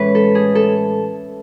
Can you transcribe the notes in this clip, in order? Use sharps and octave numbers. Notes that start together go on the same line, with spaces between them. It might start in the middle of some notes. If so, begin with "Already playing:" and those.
Already playing: A2 E3 G#3 C#4 B4 C#5 E5
A4
G#4
A4